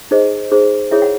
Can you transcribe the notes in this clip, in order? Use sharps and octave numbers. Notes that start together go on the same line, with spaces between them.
D#4 G#4 C5 D#5
D#4 G#4 C5
E4 G#4 C#5 E5
F#5